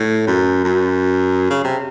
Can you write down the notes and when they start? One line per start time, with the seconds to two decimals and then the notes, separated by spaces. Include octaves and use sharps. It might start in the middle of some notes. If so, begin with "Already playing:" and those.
Already playing: A2
0.27 F#2
0.64 F#2
1.50 C#3
1.64 C3